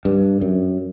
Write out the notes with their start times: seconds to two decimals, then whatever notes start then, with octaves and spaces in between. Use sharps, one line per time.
0.05 G2
0.41 F#2